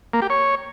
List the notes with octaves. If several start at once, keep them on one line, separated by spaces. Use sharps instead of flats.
A#3
G4
C#5